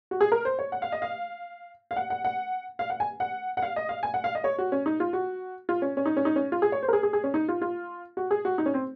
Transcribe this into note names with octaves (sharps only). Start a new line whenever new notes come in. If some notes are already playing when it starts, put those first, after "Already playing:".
F#4
G#4
A#4
C5
C#5
F#5
F5
D#5
F5
F5
F#5
F#5
F#5
F5
F#5
G#5
F#5
F#5
F5
D#5
F5
G#5
F#5
F5
D#5
C#5
F#4
C#4
D#4
F4
F#4
F4
C#4
C#4
D#4
C#4
D#4
C#4
F4
G#4
C#5
C5
A#4
G#4
G#4
G#4
C#4
D#4
F4
F4
F#4
G#4
F#4
D#4
C#4
C4